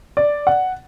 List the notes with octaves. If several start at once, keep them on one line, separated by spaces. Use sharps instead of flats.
D5
F#5